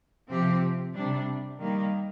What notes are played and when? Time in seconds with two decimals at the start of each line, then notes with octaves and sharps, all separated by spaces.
0.31 C3 F3 C4 G4
0.95 C3 G3 D4
1.60 D#3 G3 A#3